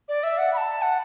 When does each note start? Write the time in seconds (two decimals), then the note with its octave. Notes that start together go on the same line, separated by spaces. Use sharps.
0.09 D5
0.23 E5
0.38 F#5
0.53 B5
0.57 A5
0.82 F#5